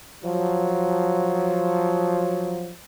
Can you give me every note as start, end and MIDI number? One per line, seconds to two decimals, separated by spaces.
0.24 2.72 53
0.24 2.72 54